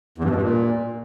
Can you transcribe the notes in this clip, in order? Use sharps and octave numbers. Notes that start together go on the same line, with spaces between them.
E2
G2
B2
G2
A#2